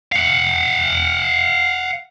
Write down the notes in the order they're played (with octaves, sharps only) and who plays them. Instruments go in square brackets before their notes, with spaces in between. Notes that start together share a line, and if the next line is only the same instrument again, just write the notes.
[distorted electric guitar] F5 F#5